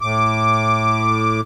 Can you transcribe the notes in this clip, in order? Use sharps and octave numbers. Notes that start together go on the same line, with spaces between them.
A2 D6